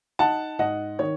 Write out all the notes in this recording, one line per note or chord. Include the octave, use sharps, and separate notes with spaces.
D#4 F#5 A5
G#2 D#5 F#5
D#3 C#5